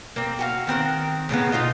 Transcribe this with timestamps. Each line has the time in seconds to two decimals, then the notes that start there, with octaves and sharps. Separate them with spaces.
0.16 A#3 C4
0.39 F#4 G4 F5
0.67 D#3 C4 A#4 F#5
1.29 A2 C#3 A#3 B3
1.52 B2 D#4 F4 D#5